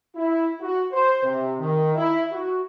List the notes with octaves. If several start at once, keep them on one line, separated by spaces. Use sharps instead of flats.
E4
F#4
C5
C3
D#3
E4
F#4